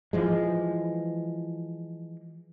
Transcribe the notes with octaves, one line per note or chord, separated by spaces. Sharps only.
E3 F3 G#3